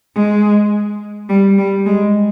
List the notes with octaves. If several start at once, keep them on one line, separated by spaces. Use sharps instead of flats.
G#3
G3
G3
G#3